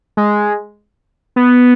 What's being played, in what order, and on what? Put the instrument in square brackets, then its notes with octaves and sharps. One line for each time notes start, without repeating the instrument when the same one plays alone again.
[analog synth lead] G#3
B3